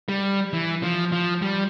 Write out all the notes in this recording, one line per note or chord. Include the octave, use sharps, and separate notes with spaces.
G3
E3
F3
F3
G3